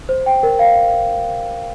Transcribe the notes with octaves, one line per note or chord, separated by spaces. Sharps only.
C5
G5
A#4
F5